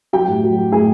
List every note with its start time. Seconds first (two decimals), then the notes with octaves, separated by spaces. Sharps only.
0.13 F#3 G4 G5
0.28 A2
0.43 F#3
0.58 F#3
0.72 A2 G#4 G#5